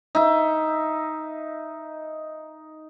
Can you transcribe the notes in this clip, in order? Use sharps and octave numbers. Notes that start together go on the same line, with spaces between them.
D#4 E5